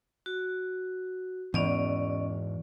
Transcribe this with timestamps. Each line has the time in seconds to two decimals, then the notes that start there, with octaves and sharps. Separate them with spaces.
0.26 F#4
1.54 E2 G#2 E3 C#4 D5 D#5